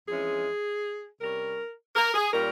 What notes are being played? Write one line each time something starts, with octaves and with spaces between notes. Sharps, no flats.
F2 E3 G#3 C#4 G#4
C3 G3 C#4 A#4
A#4
G#4
A#2 G3 C#4 A#4